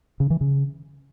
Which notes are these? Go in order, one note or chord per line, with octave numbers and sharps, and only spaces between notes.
C#3
E3
C#3